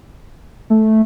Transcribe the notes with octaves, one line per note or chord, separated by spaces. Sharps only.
A3